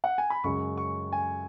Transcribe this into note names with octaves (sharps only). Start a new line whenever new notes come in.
F#5
G#5
B5
F#2 C#3 G#3 C#6
C#6
G#5